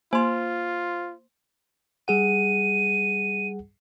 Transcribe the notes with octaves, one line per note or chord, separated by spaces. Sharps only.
A#3 F4 C5 C6
G3 G#4 F#5 D#7